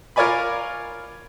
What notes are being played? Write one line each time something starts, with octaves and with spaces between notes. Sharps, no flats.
F4 A#4 C#5 D5 G#5 B5